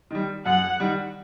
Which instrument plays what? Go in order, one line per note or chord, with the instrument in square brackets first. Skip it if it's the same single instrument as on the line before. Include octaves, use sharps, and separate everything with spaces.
[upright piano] D#3 G3
[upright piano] F#2 [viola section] F#5
[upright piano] D#3 G3